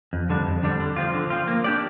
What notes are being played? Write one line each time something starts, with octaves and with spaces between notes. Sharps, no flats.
F2
D3 G3 D4
F2
D3 G3 D4
D3
F3 C4 F4
D3
F3 C4 F4
A#3
D4 G4 D5